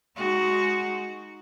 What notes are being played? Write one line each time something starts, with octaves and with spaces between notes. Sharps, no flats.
G#3 D#4 F#4